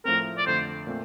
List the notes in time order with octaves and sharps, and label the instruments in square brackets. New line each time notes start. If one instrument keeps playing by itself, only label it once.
[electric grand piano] A2 F3 A3 C4 [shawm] A#4
[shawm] D5
[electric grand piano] F2 D3 A3 [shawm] C5
[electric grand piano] A#2 A3 C4